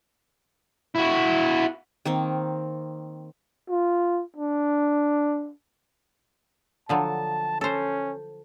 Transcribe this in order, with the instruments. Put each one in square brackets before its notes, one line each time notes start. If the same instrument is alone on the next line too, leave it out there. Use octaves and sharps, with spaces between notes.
[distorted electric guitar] E4 F#4
[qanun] D#3 A#3 C4
[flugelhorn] F4
D4
[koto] D3 F3 F#3 [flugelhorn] A5
[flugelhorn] C#4 [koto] A4 C5